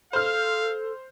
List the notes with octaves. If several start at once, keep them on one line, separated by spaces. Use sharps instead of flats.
A4 C5 F5 F6